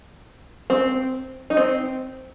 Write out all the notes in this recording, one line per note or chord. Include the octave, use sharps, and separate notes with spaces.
C4
D#4
C4